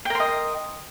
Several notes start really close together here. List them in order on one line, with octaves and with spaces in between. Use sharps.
G5 A#4 C6 D#5